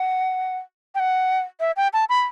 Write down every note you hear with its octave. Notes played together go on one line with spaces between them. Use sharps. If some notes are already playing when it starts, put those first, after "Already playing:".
Already playing: F#5
G5
F#5
E5
G5
A5
B5